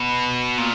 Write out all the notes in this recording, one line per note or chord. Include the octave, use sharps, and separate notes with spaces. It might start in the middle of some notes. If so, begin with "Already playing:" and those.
Already playing: B2
A#2